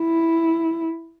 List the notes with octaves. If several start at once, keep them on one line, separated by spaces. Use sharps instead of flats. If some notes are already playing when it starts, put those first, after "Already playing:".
Already playing: E4